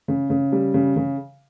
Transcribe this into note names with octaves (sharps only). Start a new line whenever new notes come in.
C#3
C#3
G3
C#3
C#3